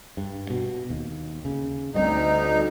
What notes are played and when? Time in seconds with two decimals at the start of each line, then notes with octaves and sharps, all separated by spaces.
0.17 G2
0.50 B2
0.90 D#2
1.45 C#3
1.94 D2 G2 G3 C4 D#4